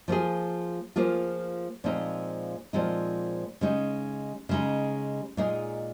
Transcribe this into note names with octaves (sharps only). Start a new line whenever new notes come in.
F3 A#3 F4 G#4
F3 A#3 F4 G#4
A#2 F3 G#3 C4 D#4
A#2 F3 G#3 C4 D#4
C#3 G#3 D#4
C#3 G#3 D#4
A#2 G#3 D#4 G#4